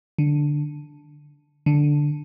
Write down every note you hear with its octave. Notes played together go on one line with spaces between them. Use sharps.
D3
D3